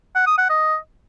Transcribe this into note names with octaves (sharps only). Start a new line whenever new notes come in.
F#5
D#6
F#5
D#5